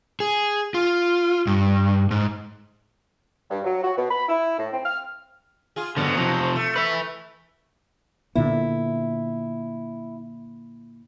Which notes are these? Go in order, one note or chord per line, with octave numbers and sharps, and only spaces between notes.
G#4
F4
G2
G#2
G2
F#3
F#4
B2
B5
E4
A2
C4
F6
F4 G#4
F2 D3 F#3 B3
C3 F3
A3
B4 E5
A#2 D3 B3 E4